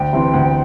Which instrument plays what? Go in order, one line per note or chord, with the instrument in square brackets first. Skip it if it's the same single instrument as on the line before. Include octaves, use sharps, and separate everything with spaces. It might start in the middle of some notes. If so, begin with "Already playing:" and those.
Already playing: [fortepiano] D2 [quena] G5
[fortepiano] C3 E3 C4
D2